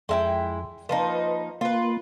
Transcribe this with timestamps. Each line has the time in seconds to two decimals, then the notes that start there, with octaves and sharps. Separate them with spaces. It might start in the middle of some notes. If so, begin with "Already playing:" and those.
0.09 F2 G#3 E4 G5
0.89 F3 A#3 D#4 B4
1.61 A#3 F4 B4